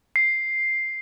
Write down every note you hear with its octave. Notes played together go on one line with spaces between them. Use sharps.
C7